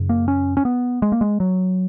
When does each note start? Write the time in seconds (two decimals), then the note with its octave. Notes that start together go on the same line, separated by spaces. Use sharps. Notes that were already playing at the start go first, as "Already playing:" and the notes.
Already playing: F#2 C#3
0.09 A#3
0.28 C#4
0.57 C#4
0.65 B3
1.02 G#3
1.12 A#3
1.21 G#3
1.40 F#3